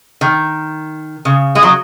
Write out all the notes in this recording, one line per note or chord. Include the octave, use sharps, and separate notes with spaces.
D#3
C#3
G#3
F#3